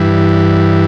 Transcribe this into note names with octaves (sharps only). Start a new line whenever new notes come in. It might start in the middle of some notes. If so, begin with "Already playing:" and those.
Already playing: G2 E3